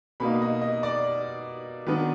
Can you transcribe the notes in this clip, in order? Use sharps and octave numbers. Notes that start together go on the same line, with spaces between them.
B2 A#3 D#4 B5
D#5
D#5
D5
D#3 F#3 B3 D4 B4